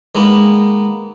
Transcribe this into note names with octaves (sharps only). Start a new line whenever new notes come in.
D#3 G#3 A#3 B3